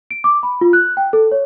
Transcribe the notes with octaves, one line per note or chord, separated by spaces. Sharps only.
D7
D6
B5
F4
F#6
G5
A4
C#5